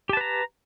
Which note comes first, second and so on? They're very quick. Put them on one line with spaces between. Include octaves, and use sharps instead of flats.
G4 A5 B4 A#5